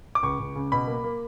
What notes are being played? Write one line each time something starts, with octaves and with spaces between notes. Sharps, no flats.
D6
C#2 C#6
C#2
C#3
B2 B5
A#3
A#3